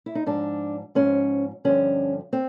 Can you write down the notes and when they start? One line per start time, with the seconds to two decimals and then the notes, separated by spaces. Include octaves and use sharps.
0.06 E4
0.15 D#4
0.26 G#2 F3 D4
0.95 G#2 F3 C#4
1.65 G2 D3 F3 C#4
2.33 C4